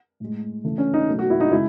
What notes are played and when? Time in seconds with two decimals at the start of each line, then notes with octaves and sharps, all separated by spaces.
0.20 A2 G#3
0.64 C#3 E3 A3
0.78 C#4
0.94 D#4
1.07 B2 F#3 A3
1.19 F#4
1.30 E4
1.40 D#4
1.52 C#3 G#3 E4